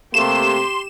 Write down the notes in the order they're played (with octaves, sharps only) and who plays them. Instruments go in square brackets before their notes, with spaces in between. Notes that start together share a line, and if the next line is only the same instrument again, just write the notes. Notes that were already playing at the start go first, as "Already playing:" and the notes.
[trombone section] C3 A3 A#3 [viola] G4 [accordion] C6 [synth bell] E7